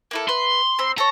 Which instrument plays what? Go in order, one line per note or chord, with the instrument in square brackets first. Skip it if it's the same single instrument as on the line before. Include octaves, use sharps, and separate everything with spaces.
[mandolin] A#3 E4 A4
[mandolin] B4 [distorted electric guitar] C6
[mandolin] C4 B5
[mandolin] A4 C#5 [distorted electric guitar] A#5